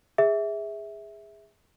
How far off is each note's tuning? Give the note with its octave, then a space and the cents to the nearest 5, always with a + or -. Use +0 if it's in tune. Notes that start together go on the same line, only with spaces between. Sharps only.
G#4 -15 E5 -15